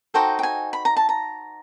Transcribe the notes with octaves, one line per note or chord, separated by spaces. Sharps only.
D#4 F#4 A4 C5 G5
G5
G#5
B5
A#5
A5
A#5